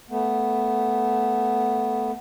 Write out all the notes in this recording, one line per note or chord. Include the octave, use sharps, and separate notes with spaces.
A3 B3